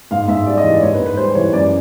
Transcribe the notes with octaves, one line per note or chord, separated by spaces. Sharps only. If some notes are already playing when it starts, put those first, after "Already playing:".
G#2 F5
G#2 E5
G3 D5
D#5
E3
D5
G#2 C#5
B4
G#2
B4
G3 C5
E3 C#5
F#2 D5